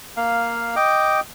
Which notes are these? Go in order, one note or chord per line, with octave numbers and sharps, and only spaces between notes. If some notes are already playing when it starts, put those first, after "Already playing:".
A#3 F5
D#5 G5 D6